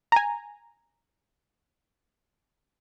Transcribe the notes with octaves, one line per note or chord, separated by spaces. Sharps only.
G#5 A#5